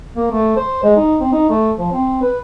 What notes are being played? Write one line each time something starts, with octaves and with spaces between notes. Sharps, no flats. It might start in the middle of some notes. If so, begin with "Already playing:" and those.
A#3
A3
C5
G#3
D#4
C4
D#4
A3
F3
C4
B4